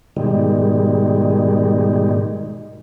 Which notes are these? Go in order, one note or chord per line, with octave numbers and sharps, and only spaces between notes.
G#2 B2 D#3 G3 G#3